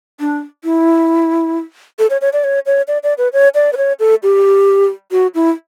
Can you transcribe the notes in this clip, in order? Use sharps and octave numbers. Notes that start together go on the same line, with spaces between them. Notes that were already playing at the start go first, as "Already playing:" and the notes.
D4
E4
A4
C#5
C#5
D5
C#5
C#5
D5
D5
B4
C#5
D5
B4
C#5
A4
G4
F#4
E4